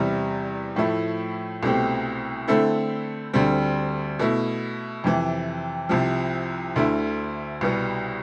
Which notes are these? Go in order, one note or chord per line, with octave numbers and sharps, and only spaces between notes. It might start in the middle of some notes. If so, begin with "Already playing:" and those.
Already playing: E2 C3 G3
A2 F3 A3 E4
C2 B2 A3 C4 G4
D3 A3 C4 E4 A4
D2 D3 G3 C4
B2 A3 E4
F2 C3 E3
C2 C3 F3
D2 D3 A3 E4
C2 B2 G3 B3